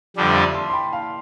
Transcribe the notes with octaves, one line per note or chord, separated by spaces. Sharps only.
F2 D3 G3 D4
E5
D5 F5
A5 C6
C6
G5 B5
F5 A5